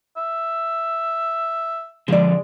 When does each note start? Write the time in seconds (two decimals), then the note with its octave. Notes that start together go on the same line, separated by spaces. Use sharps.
0.17 E5
2.08 D3 F3 G#3 D5